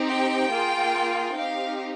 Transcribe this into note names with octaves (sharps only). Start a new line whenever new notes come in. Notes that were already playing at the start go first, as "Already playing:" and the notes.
Already playing: C4 D#4 G4
G5
A#3 F4 G#4
C4 D#4 G4 F5